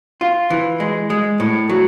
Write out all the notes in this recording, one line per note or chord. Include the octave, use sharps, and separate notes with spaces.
F4
E3
G#3
G#3
A2
F#3